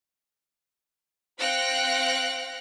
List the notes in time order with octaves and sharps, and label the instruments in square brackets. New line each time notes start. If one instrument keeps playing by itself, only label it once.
[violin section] C4 F5 G5 F#6 A#6 C#7